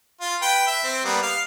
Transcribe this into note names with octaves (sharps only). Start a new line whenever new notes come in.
F4
B4 G5
E5
C4
G3 A#3 B3
F5